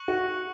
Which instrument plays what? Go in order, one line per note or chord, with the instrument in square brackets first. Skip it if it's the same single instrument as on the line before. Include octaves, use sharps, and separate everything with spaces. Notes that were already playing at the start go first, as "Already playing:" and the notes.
Already playing: [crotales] C#6 F#6 C#7 F#7
[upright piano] F#4